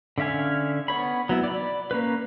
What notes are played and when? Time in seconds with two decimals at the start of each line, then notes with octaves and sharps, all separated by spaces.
0.18 D3 C#4 E5 F5 G#5
0.88 B3 C#5 B5
1.29 F#3 B3 E4
1.44 D5 B5
1.91 A#3 C#4 B4